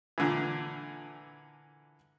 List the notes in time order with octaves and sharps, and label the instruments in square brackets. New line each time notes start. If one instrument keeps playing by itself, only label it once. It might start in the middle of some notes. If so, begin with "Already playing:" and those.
[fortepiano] A#2 D3 E3